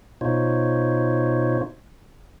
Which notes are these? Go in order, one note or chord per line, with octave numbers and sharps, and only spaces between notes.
B2 D#4 F4 C5 C#5